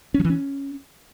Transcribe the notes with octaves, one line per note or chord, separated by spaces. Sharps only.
C#4
F3
E3
C#4